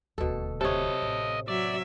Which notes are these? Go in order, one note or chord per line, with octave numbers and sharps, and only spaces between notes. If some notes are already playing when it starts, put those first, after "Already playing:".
D#1 D2 B2 A4
C3 A4 C#5 D#5
A1
F#3 D5 E5